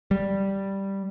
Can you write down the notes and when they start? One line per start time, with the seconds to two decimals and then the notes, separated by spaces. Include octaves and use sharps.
0.11 G3